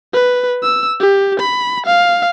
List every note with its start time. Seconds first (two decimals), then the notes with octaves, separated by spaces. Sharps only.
0.13 B4
0.63 E6
1.00 G4
1.40 B5
1.86 F5